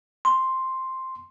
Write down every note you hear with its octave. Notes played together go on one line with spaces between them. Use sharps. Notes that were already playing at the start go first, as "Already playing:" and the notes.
C6